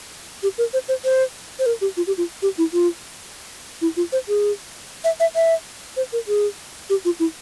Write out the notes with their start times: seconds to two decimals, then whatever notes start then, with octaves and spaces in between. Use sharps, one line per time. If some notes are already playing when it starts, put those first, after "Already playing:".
0.43 G4
0.58 A#4
0.73 C5
0.88 C5
1.04 C5
1.59 C5
1.66 A#4
1.81 G4
1.97 F4
2.07 G4
2.17 F4
2.42 G4
2.58 E4
2.73 F4
3.81 E4
3.97 F4
4.12 C5
4.28 G#4
5.04 E5
5.20 E5
5.35 E5
5.97 C5
6.13 A#4
6.28 G#4
6.90 G4
7.05 F4
7.19 E4